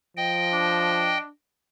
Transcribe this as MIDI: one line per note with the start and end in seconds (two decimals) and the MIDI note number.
0.17 1.17 53
0.17 1.18 75
0.17 1.18 79
0.53 1.29 62